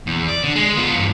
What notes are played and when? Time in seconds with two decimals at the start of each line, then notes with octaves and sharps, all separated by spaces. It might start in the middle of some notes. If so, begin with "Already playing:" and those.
0.07 E2
0.28 D5
0.44 D3
0.56 G#3
0.77 B3 F4
0.96 G2 E3